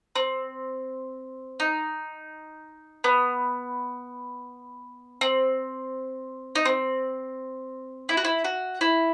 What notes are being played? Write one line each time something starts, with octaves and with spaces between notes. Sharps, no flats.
C4
D#4
B3
C4
D#4
C4
E4
F#4
E4
F#4
E4